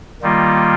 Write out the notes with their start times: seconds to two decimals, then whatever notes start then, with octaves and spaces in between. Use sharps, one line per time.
0.22 D#3 G3 A#3 F4